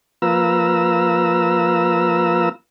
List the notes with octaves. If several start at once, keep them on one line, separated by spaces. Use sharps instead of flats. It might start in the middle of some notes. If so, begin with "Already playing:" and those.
F3 A#3 F4 B4 A#5 E6